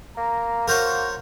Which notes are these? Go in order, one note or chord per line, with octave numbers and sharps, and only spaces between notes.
A#3 A#5
F#4 A#4 C5 C#5